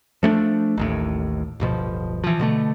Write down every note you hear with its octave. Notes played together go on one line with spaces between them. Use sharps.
F3 A3 C#4 D4
A1 D#2 A2
D1 G1 B2 F3
E3 F3
B2 D3 A3